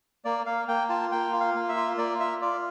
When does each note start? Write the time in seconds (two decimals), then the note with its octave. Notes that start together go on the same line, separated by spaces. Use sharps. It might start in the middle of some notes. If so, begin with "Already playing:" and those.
0.25 A#3 D5
0.46 A#3 F5
0.68 A#3 G5
0.89 F4 A5
1.12 A#3 G5
1.33 F4
1.40 F5
1.55 A#3
1.69 E5
1.77 F4
1.98 A#3 D5
2.19 F4 E5
2.41 F4 D5